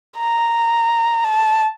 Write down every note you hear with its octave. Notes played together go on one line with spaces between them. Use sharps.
A#5
A5